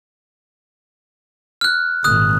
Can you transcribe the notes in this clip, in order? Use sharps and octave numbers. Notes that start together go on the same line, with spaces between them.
F6 F#6
G#1 A#2 D#6 F#6